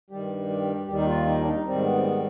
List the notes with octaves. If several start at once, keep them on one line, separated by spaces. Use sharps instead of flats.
G2 D#3 G3 G4
G4
D#2 D#3 G3 G4
D#4
F4
D#4
D4
D#4
G#2 D#3 G3 C4
B3
C4
B3